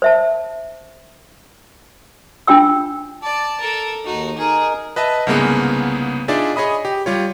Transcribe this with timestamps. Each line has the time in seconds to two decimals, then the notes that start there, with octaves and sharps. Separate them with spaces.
0.02 C5 E5 A5
2.47 D4 F4 G5 E6
3.23 D5 A5
3.60 A4 A#4
4.05 D#2 D#4 F#4
4.38 D#4 G#4 A#4
4.96 B4 D#5 E5 A5
5.27 C2 G#2 C#3 A#3 B3 G#4
6.28 D4 D#4 F4 G#4 D5 E5
6.56 G#4 C#5 D#5 B5 D#6
6.85 G4
7.06 G3 F4 C#5